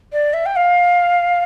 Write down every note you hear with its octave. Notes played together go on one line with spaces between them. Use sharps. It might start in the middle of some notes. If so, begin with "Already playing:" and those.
D5
E5
G5
F5